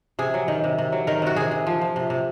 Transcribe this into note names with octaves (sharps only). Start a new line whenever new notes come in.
C3 G#4
F#3
D#3
C3
C3
F#3
D#3 A#4
C3 F#4
C3 G#4
C3
F3
F3
C3
C3